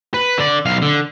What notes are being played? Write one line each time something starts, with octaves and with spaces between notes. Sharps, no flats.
B4
D3 D5
B1 F5
D3